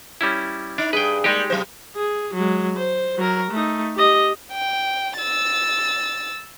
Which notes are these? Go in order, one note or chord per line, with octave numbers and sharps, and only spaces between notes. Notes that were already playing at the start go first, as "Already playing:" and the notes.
G3 C#4 E4
D4 D#4
G2 G#4 B4 G5
G3 G#3 A#3 D#4 G4
C3 F#3 C5
G#4
F#3 G#3
C5
F#3 A#4
A3 D#4
G4 D#5
G5
E6 A6